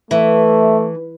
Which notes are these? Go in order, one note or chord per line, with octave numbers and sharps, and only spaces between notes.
E3 A3 E5